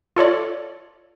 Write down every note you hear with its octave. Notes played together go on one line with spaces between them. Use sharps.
F4 A4 C#5 D5